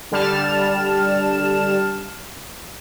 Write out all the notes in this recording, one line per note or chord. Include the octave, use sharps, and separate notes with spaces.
D3 G3 A5 F6 E7